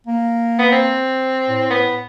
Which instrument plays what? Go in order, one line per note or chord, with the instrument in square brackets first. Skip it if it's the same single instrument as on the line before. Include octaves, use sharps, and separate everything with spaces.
[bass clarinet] A#3
[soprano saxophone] B3
C4
[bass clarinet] A2
[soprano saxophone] B3